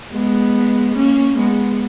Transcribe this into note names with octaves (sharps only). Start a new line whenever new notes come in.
G#3 B3
A#3 C#4
G#3 B3